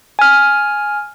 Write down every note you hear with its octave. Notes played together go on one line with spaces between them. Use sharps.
G#5 F6